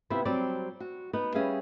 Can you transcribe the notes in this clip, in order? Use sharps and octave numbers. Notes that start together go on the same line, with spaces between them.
C3 B3 E4 F4 G4 C5
F#3 G3 C4 C5 D5
F#4
B3 D#4 F#5
G3 C#4 G#4 E5 F5